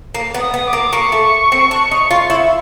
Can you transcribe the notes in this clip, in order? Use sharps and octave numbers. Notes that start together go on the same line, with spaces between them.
A#3
B3
D#6
B3
D6
A#3
A#3 C#6
A3
C4
D4
D#4
F4
E4